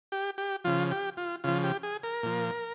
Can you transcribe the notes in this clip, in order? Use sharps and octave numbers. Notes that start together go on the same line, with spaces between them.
G4
G4
C#3 F3 F4
G4
F4
C#3 F3 F4
G4
G#4
A#4
A#2 F3